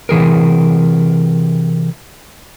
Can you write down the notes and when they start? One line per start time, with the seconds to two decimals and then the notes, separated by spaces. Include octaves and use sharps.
0.09 C3 E3 G#4 A#4